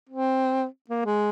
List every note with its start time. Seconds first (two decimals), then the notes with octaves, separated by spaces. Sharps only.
0.09 C4
0.90 A#3
1.05 G#3